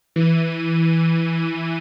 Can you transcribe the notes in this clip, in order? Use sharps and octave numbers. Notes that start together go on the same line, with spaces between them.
E3 D#7